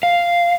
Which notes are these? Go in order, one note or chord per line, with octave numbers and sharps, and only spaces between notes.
F5